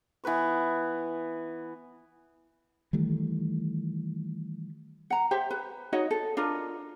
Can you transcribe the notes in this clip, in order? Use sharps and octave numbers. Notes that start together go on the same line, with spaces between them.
E3 B3 B4 C#6
D#3 E3 G3 A3
F#5 A#5
G4 C5 E5
B4
D#4 F#4 C#5 D#5
A4
D4 F4 A#4 D#5